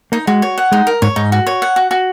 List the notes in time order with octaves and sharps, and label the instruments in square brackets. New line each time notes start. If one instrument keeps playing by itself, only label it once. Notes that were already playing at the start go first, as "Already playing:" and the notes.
[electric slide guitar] A#3 [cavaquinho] D#4
[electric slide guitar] G#3 [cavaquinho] F#4
[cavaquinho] C#5
F#5
[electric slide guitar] G#3 [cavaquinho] D#4
[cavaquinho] A#4
[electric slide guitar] G#2 [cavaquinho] C#5
[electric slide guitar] G#2 [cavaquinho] D#4
[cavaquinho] F#4
C#5
F#5
F#4
F#4